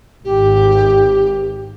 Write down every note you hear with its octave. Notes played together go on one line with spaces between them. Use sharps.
G#1 G4